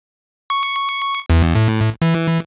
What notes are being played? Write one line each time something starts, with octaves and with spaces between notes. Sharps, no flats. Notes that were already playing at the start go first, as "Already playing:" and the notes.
C#6
E2
A2
E3